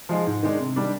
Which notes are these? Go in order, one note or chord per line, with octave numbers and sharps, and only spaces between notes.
F3 G#3 D#4 G#4
G#2
D#3 G#3 D4
C3
D#3 G3 D4